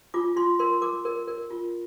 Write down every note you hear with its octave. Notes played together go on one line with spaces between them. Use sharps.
F4 D6
F4 C6
A#4 C6
A#4 D6
A#4
A#4
F4